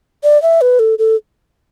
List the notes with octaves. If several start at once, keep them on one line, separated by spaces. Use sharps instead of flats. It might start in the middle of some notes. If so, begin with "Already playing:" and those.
D5
E5
B4
A4
A4